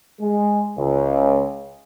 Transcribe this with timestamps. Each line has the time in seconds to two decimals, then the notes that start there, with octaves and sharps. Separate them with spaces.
0.20 G#3
0.77 C#2